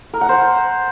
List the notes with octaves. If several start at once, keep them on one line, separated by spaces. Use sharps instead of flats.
A#4
F#5
C5